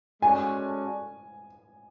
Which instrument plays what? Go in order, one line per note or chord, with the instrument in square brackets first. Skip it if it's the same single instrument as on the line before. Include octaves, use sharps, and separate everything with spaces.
[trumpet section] G#3 C#4 F#4 A4 D5 [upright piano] G#5